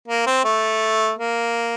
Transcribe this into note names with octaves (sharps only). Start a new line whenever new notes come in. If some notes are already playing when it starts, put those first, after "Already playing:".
A#3
C4
A3
A#3